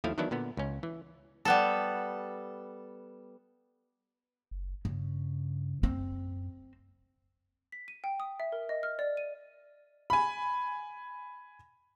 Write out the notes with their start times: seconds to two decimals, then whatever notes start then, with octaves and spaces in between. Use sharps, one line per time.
0.04 D#2 F3 A3 E4 F5
0.18 D#3 E3 F#3 B3 D4 E4
0.31 A#2 D3 B3
0.57 C#2 C#4
0.83 E3
1.45 G3 B3 A4
4.51 F#1
4.85 G2 C#3
5.83 F#2 C4
7.72 B6
7.88 D#7
8.04 G5
8.20 D#6
8.40 E5
8.52 A#4
8.69 D#5
8.83 F6
8.99 D5
9.17 D#7
10.10 G#5 B5